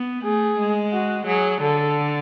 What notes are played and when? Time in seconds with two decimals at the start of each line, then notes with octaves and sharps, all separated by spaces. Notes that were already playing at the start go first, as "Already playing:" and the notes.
Already playing: B3
0.25 A3 G#4
0.59 G#3
0.93 F#4
1.27 F#3 G#4
1.61 D3 A4